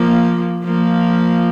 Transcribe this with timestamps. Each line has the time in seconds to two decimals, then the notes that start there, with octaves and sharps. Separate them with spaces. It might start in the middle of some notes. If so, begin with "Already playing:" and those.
Already playing: F3 A#3
0.64 F3 A#3